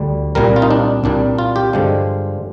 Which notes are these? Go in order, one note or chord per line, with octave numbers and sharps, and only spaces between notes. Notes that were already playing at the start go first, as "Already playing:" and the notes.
Already playing: D2 D3 G3
C2 A#2 G3 A#4
F4
D#4
D4
C2 A#2 G3 D4
F4
G4
G2 D3 F3 G#3